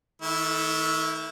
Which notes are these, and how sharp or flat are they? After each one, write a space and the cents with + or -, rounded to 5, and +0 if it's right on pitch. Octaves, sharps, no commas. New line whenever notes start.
D#3 +40 A3 +0 E4 -5